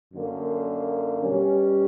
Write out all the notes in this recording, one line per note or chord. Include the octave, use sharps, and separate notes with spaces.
F#2 D3 A#3
B2 G3 C#4